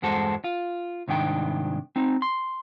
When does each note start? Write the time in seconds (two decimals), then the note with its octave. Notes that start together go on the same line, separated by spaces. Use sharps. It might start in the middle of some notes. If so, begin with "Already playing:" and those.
0.02 E2 G2 G#3 F#4 A4 C5
0.44 F4
1.08 C2 G#2 D#3 D4 G5
1.96 C4 D#4
2.22 C6